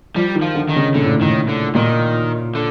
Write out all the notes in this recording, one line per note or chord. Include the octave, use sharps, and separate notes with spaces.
F3 G3
D#3
F3
D3
D#3
C#3
A#2 D3
A2
A2 D#3
D3
A#2 D#3
D3